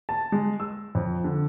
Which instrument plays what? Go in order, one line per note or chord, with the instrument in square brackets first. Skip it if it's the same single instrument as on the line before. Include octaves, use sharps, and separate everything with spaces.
[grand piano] A5
G#3
E6
F2
D3